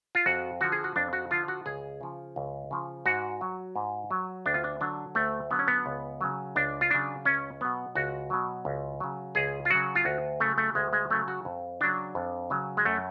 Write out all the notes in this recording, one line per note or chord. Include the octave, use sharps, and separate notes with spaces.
F4
F2 F#4
D3 F3 F#4
G#4
F#4
F2 D4
F#4
D3 F3 F4
F#4
C#2 G#4
C#3 F3
C#2
C#3 F3
G#2 F#4
F#3
G#2
F#3
D2 D4
F4
D4
D3 F#3 D4
D2 A3
D3 F#3 B3
C#4
B3
C#2
C#3 F#3
C#2 D4
F4
C#3 F#3 D4
C#2 C#4
B2 F#3 B3
C#2 F#4
B2 F#3
C#2
C#3 F#3
C#2 G#4
F4
C#3 F#3 F#4
F4
D2 F#4
C#3 F#3 A3
A3
D2 G#3
G#3
C#3 F#3 A3
F#4
F2
C#3 F#3 D4
F2
C#3 F#3
G#3
F#2 A3